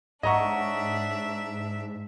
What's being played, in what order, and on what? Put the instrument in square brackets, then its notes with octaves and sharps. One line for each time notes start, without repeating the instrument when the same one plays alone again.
[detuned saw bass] G#2 [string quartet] D4 E5 [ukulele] C#5 F#5 [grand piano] D#5 A#5 C#6